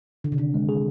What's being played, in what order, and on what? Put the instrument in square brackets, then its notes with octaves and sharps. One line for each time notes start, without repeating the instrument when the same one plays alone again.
[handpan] D3 [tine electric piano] D#3
[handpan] C3
[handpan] D3 [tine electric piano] D4
[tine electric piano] G#3
G#4